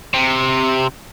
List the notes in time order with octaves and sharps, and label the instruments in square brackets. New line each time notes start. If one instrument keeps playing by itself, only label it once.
[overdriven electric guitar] C3